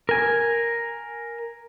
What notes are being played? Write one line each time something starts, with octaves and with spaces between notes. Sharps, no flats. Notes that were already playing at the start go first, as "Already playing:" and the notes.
A#4 G#5